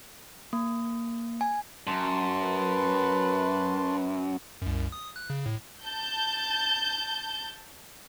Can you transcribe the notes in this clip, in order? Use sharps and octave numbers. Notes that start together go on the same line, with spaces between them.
A#3
G#5
F#2 A5 C6
B4
C2 F#2
D#6
F#6
C#3
A2
A5 G6